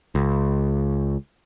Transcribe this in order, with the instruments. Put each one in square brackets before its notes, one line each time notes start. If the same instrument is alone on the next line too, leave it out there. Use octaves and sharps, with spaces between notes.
[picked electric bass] C#2